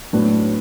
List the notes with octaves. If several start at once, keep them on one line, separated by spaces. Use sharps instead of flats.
A2 F#3 B3 D4